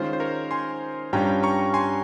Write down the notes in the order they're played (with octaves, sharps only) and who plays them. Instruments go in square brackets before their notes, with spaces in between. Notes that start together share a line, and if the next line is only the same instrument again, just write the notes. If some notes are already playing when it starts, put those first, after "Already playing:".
Already playing: [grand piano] D#3 G#3 C#4 F4 [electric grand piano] C5
[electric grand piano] C5
A#4 C#5
G#5 C6
[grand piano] G2 G3 C#4 F4 [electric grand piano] G5 A#5
[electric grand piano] A#5 C#6
G#5 C6